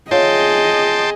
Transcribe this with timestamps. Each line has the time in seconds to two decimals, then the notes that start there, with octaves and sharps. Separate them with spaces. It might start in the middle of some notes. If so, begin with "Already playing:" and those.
0.11 F4 G#4 C#5 D#5 E5 G5 A5 C6